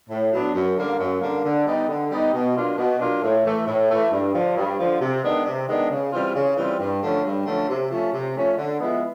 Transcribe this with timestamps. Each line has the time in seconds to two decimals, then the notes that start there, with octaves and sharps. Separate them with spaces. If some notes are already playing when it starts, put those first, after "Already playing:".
0.09 A2
0.32 F#3 B3 D4
0.54 F#2
0.76 D3 G3 A#3
0.99 F#2
1.21 D3 G3 A#3
1.44 D3
1.66 G3 B3 D#4
1.88 D3
2.11 G3 B3 D#4
2.33 B2
2.55 F#3 A#3 D4 F4
2.78 B2
3.00 F#3 A#3 D4 F4
3.22 A2
3.44 E3 A3
3.67 A2
3.89 E3 A3
4.11 G2
4.34 D3 F3
4.56 G2
4.78 D3 F3
5.01 C3
5.23 D#3 G#3 B3 D4
5.45 C3
5.68 D#3 G#3 B3 D4
5.90 C#3
6.12 E3 G3 C4 F4
6.34 C#3
6.57 E3 G3 C4 F4
6.79 G2
7.02 D3 F3 A3 C#4
7.24 G2
7.46 D3 F3 A3 C#4
7.69 C3
7.91 F3 A3 C#4
8.13 C3
8.36 F3 A3 C#4
8.57 D3
8.80 F3 G#3 B3 E4